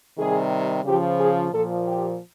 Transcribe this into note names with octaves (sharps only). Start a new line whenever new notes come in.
C3 D#3 G3 G#4
C#3 F3 G4
G#4
A#2 F3 A4
G4